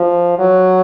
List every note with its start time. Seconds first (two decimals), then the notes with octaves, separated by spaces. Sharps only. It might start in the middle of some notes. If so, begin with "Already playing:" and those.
Already playing: F3
0.39 F#3